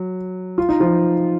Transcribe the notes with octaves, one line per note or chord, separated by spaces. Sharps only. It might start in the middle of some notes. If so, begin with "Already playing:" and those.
Already playing: F#3
F4
D#4
F3 F4